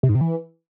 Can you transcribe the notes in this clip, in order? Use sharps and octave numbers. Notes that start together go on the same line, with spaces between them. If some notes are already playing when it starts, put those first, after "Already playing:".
C3
G#2
C3
E3